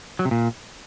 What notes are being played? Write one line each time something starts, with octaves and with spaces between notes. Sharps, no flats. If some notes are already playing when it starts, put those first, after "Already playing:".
F#3
C3
A#2